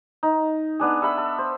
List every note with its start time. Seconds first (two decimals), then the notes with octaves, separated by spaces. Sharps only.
0.23 D#4
0.80 B3 D4 G#4
1.02 A4 E5 B5 E6
1.18 A4
1.38 C5